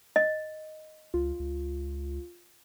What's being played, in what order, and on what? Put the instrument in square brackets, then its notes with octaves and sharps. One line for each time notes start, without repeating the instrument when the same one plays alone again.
[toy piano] D#5
[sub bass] C#2 [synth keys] F4
[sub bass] C#2